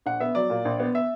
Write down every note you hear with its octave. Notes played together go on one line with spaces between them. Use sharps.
A#1 F#5
B3 E5
F#3 D5
A#2
A#1
B3
E5